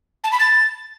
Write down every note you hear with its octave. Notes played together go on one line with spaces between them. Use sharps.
A5
B5
A6